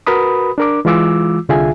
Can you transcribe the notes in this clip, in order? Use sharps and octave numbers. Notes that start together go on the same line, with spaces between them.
F#4 A#4 B4 B5 D#6
D4 A#4 D6
E3 G#3 F4 D6 E6
C2 D3 F4 G#4 E5 G#5